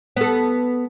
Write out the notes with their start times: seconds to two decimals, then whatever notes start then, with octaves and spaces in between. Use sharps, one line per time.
0.16 B3 A4